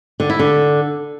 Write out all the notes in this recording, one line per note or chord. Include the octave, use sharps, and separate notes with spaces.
D3
E4
D3